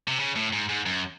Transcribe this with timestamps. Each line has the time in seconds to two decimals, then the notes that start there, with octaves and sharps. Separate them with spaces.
0.08 C3
0.20 C#3
0.36 A2
0.53 G#2
0.69 G#2
0.86 F#2